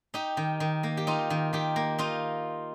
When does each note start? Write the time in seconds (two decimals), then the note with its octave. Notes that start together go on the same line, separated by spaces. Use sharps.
0.14 D#4 G4
0.37 D#3
0.60 D#3
0.83 A#3
0.97 G4
1.07 D#4 F4
1.30 D#3
1.53 D#3 G4
1.76 A#3
1.98 D#4 F4